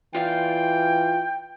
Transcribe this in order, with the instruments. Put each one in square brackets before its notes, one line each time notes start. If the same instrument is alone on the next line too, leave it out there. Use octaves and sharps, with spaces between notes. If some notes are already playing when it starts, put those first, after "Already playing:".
[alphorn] E3 [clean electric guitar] F4 D5 F5 [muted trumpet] G5